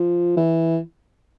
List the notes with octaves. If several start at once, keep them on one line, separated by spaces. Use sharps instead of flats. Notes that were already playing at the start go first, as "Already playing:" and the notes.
Already playing: F3
E3